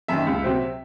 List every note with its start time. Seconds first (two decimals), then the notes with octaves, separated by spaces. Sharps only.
0.08 F#2 D#3 E5
0.27 C#2
0.44 C3 F#3 C4